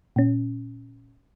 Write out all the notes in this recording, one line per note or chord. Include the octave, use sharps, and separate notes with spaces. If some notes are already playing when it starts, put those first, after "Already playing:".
A#2 C#4